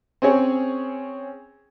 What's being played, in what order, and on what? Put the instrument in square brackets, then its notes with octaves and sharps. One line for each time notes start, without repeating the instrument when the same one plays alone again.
[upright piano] C4 C#4 G#4 C#5